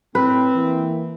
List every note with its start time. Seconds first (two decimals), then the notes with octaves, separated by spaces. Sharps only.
0.15 A2 C4 B4
0.55 E3 A#3